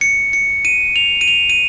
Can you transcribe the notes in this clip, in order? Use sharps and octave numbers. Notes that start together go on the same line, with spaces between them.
C#7
C#7
D#7
F7
D#7
F7
D#7